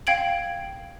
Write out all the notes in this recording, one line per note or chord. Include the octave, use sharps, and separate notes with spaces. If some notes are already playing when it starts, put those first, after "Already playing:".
F5 G5 G#6 D7 F#7